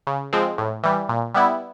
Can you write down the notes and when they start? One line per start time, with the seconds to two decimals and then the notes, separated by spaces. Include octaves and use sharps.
0.07 C#3
0.33 F3 G#3 C4
0.58 A2
0.83 E3 G3
1.09 A#2
1.34 G3 B3 E4